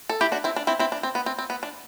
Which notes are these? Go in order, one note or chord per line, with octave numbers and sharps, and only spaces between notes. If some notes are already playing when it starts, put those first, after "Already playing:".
A4
E4 G4
D4 F#4
C4 E4
D4
C4 E4
C4 E4
D4
C4
B3
C4
C4
B3
D4